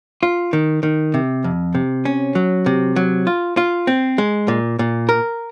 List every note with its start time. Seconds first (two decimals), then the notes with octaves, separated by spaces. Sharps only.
0.23 F4
0.53 D#3
0.83 D#3
1.14 C3
1.44 F2
1.75 C3
2.05 C#4
2.35 F#3
2.66 C3
2.96 F#3
3.27 F4
3.57 F4
3.87 C4
4.18 G#3
4.48 A#2
4.79 A#2
5.09 A#4